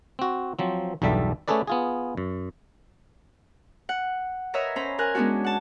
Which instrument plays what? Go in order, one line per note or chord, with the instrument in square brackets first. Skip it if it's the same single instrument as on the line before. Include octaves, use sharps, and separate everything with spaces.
[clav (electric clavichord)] C4 F#4
F3 F#3 C4
B1 E2 G2 G3 A4 E5
A3 C#4 G#4 A4 B4 D5
B3 F4 G#4
F#2
[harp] F#5
A#4 B4 C#5 D#5 E5 A#5
C#4 C5 A#5 B5
A#4 G#5 F#6
G#3 B3 C#4 D4 F#4
F#5 A5